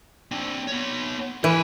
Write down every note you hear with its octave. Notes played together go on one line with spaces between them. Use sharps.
C4 D4
B3 C#5
E3 A#4 B5